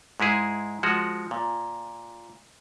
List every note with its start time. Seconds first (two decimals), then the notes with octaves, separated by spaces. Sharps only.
0.20 G#2 G#3 E4 G#4
0.83 F3 G#3 F#4
1.31 A#2